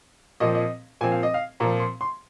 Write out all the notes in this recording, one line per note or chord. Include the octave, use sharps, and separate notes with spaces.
A#2 F3 C4 D#5
D#5
A#2 F3 C4 G#5
F5
D#5
F5
A#2 F3 C4 A#5
C6
C6